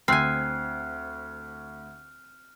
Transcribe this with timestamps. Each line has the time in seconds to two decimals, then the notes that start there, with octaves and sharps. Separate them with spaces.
0.08 D2 C4 G#5 F6 F#6 C7